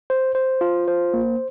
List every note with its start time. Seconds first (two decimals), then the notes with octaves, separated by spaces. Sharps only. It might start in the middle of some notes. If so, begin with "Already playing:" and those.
0.10 C5
0.35 C5
0.61 F4
0.88 C5
1.14 A#3